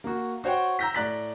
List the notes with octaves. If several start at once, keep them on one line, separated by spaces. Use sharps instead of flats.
A#3 F#4
F#4 C5 C#5 F#5 G5
A#5 E6 G6 A#6 B6
A2 D5 A#5 F#6 A6 B6